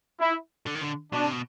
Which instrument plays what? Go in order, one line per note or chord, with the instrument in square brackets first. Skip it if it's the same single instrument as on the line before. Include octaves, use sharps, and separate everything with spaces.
[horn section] E4
[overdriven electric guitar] D3
D#3
D3
[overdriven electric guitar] B2 [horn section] D4
[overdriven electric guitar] C3
B2